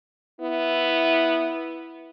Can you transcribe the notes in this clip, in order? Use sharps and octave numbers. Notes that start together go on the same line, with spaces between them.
B3 E4